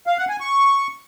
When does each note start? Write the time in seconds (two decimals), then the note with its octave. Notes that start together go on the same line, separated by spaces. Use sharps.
0.07 F5
0.18 F#5
0.29 G#5
0.40 C#6